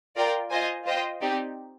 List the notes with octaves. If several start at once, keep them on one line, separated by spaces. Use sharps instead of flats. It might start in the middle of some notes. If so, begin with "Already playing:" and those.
F4 A#4 D5 G5
F4 C5 D#5 G#5
F4 C5 D#5 G5
C4 D#4 G4 D5